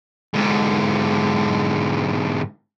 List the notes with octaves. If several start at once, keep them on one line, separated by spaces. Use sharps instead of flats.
G#2 D3